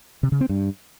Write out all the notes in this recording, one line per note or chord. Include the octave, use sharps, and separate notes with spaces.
C3
C#3
C4
G2